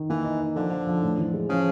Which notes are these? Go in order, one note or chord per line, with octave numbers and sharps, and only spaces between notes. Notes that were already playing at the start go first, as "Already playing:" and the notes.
Already playing: D#3
E3 A#3
D#4
D#4
D3 F3
F3
F3
A2
E3
G#3
C#3 F3